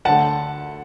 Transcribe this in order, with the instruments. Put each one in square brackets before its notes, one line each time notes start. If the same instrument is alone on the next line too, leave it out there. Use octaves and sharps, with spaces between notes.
[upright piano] D2 D3 A3 F#5 A5